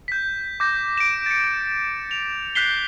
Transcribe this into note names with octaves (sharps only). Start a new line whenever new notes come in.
G6 B6
D6 G6 A#6
D7 E7
A6 C#7
F7
F#6 G6 B6 C7 G7